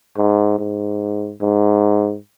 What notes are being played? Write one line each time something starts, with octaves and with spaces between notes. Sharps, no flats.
G#2
G#2
G#2